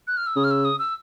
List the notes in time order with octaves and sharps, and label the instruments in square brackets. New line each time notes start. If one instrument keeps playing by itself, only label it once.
[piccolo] F#6
F6
E6
[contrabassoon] C#3 [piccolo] D#6
[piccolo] F6
E6
D#6
E6